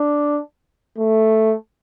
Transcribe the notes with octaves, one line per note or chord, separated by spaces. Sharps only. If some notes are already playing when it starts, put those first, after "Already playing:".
Already playing: D4
A3